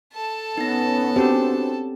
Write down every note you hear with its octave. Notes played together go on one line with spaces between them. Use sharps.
A4 A5
B3 C#4 D#4 A#6
C4 D4 F#4 G4 C5